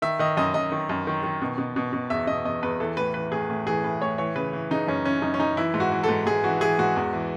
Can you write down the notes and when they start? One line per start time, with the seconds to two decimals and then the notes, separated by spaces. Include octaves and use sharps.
0.02 D#3 E5
0.19 D#3 D#5
0.37 F#2 D#5
0.54 F#2 D#5
0.72 D#3
0.89 F#2
1.07 D#3
1.23 D#3
1.42 B2
1.58 B2
1.76 B2
1.93 B2
2.10 E2 E5
2.27 B2 D#5
2.45 E2 D#5
2.62 E2 B4
2.80 E3 A4
2.97 A2 B4
3.14 E3 B4
3.32 A2 G#4
3.50 A2
3.66 E3 G#4
3.84 A2 B4
4.01 A2 C#5
4.18 E3 C#5
4.36 C#3 B4
4.53 E3
4.71 C#3 D#4
4.88 F#2 C#4
5.05 E3 C#4
5.22 F#2 D#4
5.34 C#4
5.39 F#2 D#4
5.57 E3 E4
5.74 G#2
5.80 F#4
5.92 E3
6.04 A4
6.09 G#2
6.26 G#2 G#4
6.44 E3 F#4
6.61 E3 G#4
6.78 G#2 F#4
6.96 E2
7.13 E3